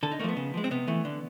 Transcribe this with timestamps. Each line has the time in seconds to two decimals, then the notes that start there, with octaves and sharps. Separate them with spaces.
0.03 D3 A4
0.12 D#4
0.19 A3 A#3
0.24 F3 B3
0.37 C#3
0.54 F3 G#3
0.64 C4
0.71 C3 B3
0.88 E3 A3
1.05 D3